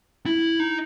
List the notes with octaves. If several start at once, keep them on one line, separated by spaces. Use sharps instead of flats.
E4
D#4